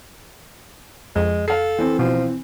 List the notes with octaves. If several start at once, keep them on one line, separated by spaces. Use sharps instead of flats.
F2 G#3
A4 F5 C7
E3 C4
B2 F3